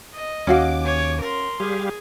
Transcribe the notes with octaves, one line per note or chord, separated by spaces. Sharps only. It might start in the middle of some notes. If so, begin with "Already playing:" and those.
D#5
D#2 C#4 F#4 F5 D6
C#5 G#5
A#4 C6
G3 G4 G#4 F5